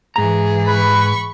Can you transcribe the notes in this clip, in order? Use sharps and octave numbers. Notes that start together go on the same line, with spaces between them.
G#2 E3 G#4 A#5
B4 B5 C#6